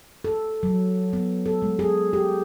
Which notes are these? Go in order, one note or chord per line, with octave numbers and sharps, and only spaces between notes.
A4
F#3
B3
A4
G#3
G#4
G4